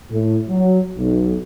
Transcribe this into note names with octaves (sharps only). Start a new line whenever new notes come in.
A2
F#3
B1